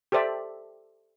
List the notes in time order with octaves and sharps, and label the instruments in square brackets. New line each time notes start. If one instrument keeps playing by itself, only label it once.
[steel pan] G4 A4 C5 D5 E5